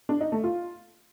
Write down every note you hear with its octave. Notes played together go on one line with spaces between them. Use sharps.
D4
D#4
A3
F4